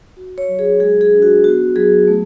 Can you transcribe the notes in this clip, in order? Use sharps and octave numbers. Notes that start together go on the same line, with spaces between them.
F#4
C#5
F#3
G#4
G#3 G#4
G#4
D4
F#4
B3 F#4
F#3 G#4
A3